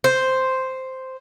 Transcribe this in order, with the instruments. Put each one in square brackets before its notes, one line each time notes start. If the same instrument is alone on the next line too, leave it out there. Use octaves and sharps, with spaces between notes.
[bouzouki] C5